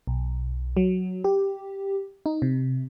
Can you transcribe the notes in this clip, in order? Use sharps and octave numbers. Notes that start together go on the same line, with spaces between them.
B1
F#3
G4
D#4
C3